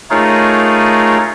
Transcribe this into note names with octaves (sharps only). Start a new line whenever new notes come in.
A3 D#4 F4 G#4 A#4 C#5